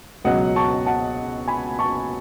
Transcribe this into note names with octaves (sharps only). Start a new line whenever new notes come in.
C#2 B2 F#3 C#4 D#5 F#5
A5 C#6
F#5 A5
G#5 B5
A5 C#6